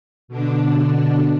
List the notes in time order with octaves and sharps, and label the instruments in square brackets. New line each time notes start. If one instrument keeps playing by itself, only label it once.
[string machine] B2 D3 D4